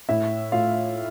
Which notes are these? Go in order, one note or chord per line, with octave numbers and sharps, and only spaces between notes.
A2 E4 E5
A2 F4 F5